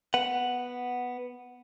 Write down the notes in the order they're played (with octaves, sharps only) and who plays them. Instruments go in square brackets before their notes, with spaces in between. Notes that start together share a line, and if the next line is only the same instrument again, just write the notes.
[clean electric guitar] B3 F#5